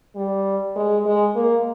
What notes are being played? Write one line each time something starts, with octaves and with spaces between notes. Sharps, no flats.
G3
G#3
G#3
A#3